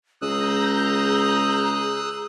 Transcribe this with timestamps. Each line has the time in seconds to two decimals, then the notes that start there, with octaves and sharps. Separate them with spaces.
0.22 C#2 G#4 A#5 D#6 E6 F#6 G6 A#6